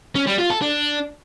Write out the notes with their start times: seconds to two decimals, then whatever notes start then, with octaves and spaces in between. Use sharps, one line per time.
0.15 C#4
0.27 G3
0.38 F4
0.50 A4
0.61 D4